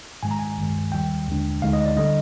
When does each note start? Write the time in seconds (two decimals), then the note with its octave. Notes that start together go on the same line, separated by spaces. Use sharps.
0.23 G#2 D#3 G#3 G#5
0.31 A#5
0.39 G#5
0.57 G#1 G2 D#3 G#3
0.92 D#2 D#3 G3 G5
1.28 D#2 D3 G#3 D4
1.62 D2 D3 G#3 D#4 F5
1.73 D#5
1.86 D5
1.96 D3 G3 D4 D#5